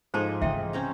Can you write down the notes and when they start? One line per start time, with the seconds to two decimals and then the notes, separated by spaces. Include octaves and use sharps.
0.14 G#2 F3 G#4 A4 C5 A5 D6
0.42 C#3 E3 D#5 E5 G5
0.73 C4 C#4 A#5